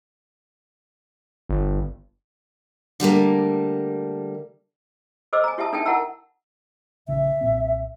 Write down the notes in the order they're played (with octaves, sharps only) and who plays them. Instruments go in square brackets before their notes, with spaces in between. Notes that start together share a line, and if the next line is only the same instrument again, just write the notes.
[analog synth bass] G1
[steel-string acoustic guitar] D3 G3 A3 A#3
[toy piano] A4 C5 D#5 D6 E6
G#5 A#5
E4 G4 E5 A5 D#6
D4 D#4 A4 E5 G5 A5
E4 A#4 F#5 A5 A#5 E6
[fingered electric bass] A#1 C#3 [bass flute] E5
[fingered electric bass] B1 A#2 C4